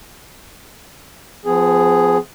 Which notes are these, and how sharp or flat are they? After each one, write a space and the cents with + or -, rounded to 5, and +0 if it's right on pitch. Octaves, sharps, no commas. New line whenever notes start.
F3 +0 B3 +45 G#4 +0